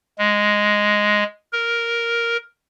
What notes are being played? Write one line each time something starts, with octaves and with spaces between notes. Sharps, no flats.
G#3
A#4